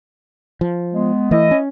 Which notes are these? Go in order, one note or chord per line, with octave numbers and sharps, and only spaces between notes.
F3
G#3 B3
E3 A3 E4 D#5
C#4